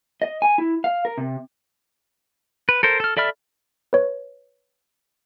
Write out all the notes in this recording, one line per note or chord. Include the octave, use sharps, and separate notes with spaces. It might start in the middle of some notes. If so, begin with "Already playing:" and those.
D#5
G#5
E4
F5
A#4
C3
B4
A4 A#4 C5
A4 F6
A4 D5 E5 B5 F6
B4 C#5